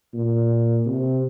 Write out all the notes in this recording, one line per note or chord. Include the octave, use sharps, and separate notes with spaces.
A#2
C3